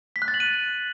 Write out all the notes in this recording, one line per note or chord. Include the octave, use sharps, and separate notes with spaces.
B6
F#6
A6
F#7
D#7